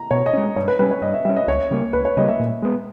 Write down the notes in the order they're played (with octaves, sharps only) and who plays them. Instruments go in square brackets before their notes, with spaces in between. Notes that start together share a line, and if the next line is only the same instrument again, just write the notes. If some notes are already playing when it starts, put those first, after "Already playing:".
Already playing: [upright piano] A#5
[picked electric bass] B2 [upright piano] C#5
[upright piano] D#5
[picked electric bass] G#3 C#4
[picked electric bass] G2 [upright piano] C#5
[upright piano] B4
[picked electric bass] G3 C#4 [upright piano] B4
[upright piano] C#5
[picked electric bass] G2 [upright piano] D#5
[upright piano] E5
[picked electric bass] G3 [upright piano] E5
[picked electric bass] C#4
[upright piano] D#5
[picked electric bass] C#2 [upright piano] C#5
[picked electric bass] C#3 G3 A#3
[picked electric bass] C#2 [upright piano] B4
[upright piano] C#5
[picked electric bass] C#3 G3 A#3 [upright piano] D#5
[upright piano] E5
[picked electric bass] A#2
G#3 B3